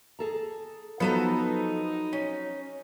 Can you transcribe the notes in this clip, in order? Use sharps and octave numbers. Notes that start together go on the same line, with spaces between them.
G#4 A4 A#5
F3 F#3 B3 D#4 A4 C5 A#5
C#4